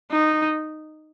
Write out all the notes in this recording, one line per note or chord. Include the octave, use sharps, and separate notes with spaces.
D#4